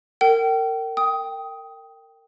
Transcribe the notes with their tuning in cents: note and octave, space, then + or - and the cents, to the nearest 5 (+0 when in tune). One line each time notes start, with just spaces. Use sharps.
A#4 -30 G5 -35
G5 +0 D#6 +15